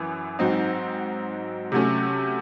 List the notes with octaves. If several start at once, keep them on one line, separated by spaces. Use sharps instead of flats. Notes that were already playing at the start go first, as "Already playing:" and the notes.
Already playing: F#2 E3
G#2 F#3 C4 D#4
C3 F#3 A3 C#4